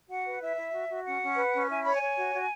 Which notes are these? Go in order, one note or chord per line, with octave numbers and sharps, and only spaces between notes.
F#4 F#5
B4
E4 E5
E4
F#4
F#4
C#4 F#5
C#4
B4
C#4
E4 G#5
C#5 B5
G#5
C#5
F#4
F#4